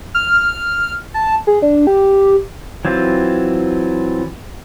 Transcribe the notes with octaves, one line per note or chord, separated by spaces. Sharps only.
F6
A5
G#4
D4
G4
E3 F#3 C4 F4